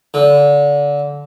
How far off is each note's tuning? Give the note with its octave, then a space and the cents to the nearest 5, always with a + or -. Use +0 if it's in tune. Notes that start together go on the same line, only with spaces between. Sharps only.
D3 -25